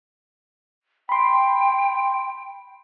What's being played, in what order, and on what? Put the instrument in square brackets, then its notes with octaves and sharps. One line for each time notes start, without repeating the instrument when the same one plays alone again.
[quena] G5 [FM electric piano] B5 C6